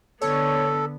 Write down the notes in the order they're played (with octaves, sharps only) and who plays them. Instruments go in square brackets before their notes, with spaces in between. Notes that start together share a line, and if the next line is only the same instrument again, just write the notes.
[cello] D3 B3 [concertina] A4 [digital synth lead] C#5